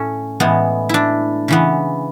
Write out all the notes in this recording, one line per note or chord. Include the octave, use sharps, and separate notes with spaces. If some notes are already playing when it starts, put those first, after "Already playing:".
Already playing: A2 A3 C#4 A4
A2 E3 G#3 B3
D4 E4
C#3 E3 B3